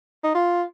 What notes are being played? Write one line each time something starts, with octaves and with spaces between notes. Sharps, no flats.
D#4
F4